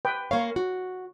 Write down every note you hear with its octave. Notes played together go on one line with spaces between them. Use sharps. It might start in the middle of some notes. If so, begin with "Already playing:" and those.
B4 G5
A#3 A#4 C#5 F5
F#4